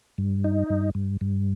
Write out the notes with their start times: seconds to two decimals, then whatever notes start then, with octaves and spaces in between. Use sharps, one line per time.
0.18 G2
0.44 D#4
0.70 G2
0.95 G2
1.21 G2